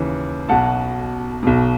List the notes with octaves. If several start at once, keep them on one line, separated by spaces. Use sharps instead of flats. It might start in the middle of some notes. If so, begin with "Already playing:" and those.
Already playing: D#2 C#3 E3
B1 B2 F#5 A5
B1 B2